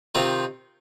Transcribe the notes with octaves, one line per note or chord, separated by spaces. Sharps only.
C3 D#3 C4 F4